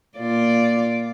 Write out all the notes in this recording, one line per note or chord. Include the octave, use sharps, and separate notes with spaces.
A#2 F4 D5